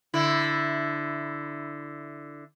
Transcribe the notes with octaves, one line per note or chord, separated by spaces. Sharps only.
D3 E4